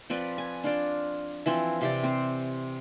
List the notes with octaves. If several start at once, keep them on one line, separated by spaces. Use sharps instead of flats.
F3 C4 B4 D5
G#5
D4 F4 D5
E3 F3 C4
C3 G4 D5
C4 C5